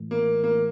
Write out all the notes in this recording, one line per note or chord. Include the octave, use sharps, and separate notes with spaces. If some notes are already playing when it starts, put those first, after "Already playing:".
Already playing: A2 E3 A3
A#3
A#3